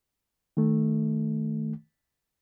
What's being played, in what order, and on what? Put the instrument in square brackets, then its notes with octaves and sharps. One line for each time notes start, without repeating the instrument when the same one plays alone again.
[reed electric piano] D#3 A3